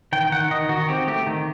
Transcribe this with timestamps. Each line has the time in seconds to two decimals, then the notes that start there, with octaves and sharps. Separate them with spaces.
0.13 D#3 G5
0.32 D#3 F#5
0.51 D#3 D#5
0.69 D#3 F#4
0.89 C4 G4
1.08 A3 G4
1.27 D#3